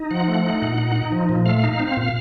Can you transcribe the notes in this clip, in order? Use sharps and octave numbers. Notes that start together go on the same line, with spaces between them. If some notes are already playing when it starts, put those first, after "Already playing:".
Already playing: D#4
F3 F#5
A3
D#4
A#2
D#4
D#4
F3
A#2
A3 F5
D#4
C4
A#2